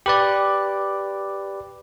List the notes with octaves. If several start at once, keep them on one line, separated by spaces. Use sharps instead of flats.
G4 B4 D5